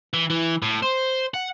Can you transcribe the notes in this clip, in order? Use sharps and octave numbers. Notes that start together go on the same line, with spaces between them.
E3
E3
A2
C5
F#5